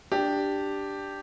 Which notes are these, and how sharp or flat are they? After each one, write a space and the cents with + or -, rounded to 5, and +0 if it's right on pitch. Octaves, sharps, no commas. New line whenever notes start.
D4 +0 G4 +0